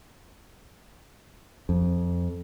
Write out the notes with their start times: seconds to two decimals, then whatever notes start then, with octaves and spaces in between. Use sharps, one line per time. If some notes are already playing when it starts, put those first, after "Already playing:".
1.69 F2